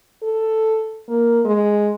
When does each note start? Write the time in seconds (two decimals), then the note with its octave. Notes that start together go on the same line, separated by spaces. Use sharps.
0.23 A4
1.08 A#3
1.45 G#3